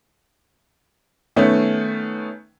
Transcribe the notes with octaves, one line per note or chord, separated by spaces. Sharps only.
D#3 A3 B3 C#4